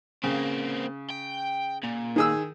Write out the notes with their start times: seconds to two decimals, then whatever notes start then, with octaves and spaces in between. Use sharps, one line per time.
0.23 C#3 A#3 C4
1.10 G5
1.83 A#2
2.16 D#3 G#4 E6